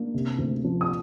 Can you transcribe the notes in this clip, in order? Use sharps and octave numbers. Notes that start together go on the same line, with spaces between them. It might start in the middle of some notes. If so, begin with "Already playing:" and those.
Already playing: A#3 D4
C3
D2
F3
D#6